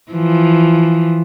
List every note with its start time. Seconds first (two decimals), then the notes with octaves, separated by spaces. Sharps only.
0.12 E3 F3